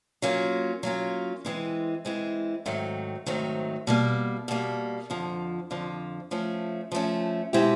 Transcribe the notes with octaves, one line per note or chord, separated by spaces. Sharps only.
F#3 A#3 C#4 F4
F#3 A#3 C#4 F4
E3 G#3 C4
E3 G#3 C4
G#2 D#3 F#3 A3 C4
G#2 D#3 F#3 A3 C4
B2 G3 A#3
B2 G3 A#3
F2 D3 F3
F2 D3 F3
F3 A3 C#4
F3 A3 C#4
B2 G#3 C4 E4 G4